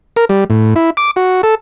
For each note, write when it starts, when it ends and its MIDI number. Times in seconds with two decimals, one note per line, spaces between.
0.17 0.25 70
0.29 0.44 55
0.50 0.74 45
0.76 0.90 64
0.97 1.11 86
1.16 1.41 66
1.43 1.55 69